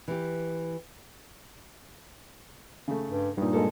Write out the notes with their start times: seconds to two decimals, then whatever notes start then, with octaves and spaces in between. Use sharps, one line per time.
0.08 E3 G4
2.88 C#3 A3
3.09 G2
3.37 G2 A#2 D#4
3.53 G#3 A#3 A4